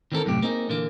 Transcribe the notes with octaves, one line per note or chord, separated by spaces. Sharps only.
D#3 E3 C4 C#4 A4 A#4
F#2 A2 C3 G4
A#3 C4 D#4 G#4
A#2 D3 E3 A#3